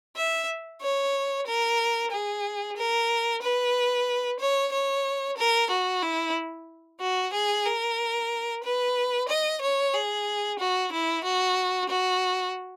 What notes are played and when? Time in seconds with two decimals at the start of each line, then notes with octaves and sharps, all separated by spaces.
0.16 E5
0.81 C#5
1.46 A#4
2.11 G#4
2.77 A#4
3.42 B4
4.40 C#5
4.72 C#5
5.38 A#4
5.70 F#4
6.03 E4
7.00 F#4
7.33 G#4
7.66 A#4
8.63 B4
9.29 D#5
9.61 C#5
9.94 G#4
10.59 F#4
10.92 E4
11.24 F#4
11.89 F#4